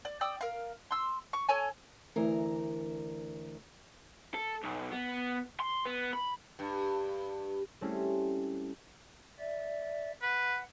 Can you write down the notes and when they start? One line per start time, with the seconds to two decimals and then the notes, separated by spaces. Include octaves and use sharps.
0.05 D5
0.21 D5 G5 D#6 E6
0.41 A#4 F5
0.91 C6 E6
1.33 C#6
1.49 A4 C#5 G#5
2.16 D2 E3 A#4
4.34 A4
4.63 B1
4.91 B3
5.60 C6
5.85 B3
6.13 B5
6.59 G2
7.81 G3 A3 C4 C#4 E4 G#4
9.39 D5 E5
10.22 B4 F#5